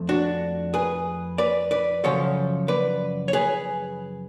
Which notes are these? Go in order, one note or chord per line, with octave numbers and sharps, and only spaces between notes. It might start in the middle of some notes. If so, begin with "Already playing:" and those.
Already playing: F2 F3 A3
D4 F#4
G#4 B4
B4 D5
B4 D5
F#2 C#3 F3 A4 C#5
B4 D5
C#5
G#4 B4